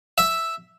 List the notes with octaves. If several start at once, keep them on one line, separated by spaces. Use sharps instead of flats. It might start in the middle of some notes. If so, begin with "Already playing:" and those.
E5